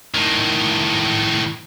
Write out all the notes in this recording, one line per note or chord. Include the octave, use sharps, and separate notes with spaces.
A2 D#3